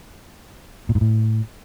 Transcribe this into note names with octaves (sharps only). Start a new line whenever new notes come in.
A#2
G#2
A2